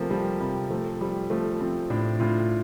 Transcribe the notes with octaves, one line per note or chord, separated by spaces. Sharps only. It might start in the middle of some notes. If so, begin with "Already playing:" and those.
Already playing: C3 F3 A3 A#3
F3 G3
C3 G3
F3 A3
F3 G3
F3 A3
F3 C4
A2 D4
A2 F4